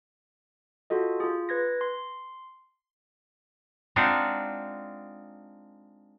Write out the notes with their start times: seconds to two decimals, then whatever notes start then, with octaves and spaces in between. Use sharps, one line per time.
0.90 F4 F#4 A4 D#5
1.20 F4 G#4
1.49 B4 G#6 A#6
1.81 C6
3.96 G#3 C4 D4 D#4 F4 F#5